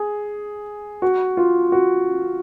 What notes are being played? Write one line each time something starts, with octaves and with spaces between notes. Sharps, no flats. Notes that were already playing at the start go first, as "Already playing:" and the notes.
Already playing: G#4
F#4
F4
F#4